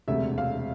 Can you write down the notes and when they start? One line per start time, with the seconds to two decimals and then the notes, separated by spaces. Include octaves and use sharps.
0.08 E1 D2 C3 E5
0.38 F5